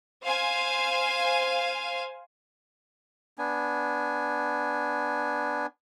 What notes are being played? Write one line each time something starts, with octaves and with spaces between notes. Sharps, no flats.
C5 F5 G#5
B3 D4 G#5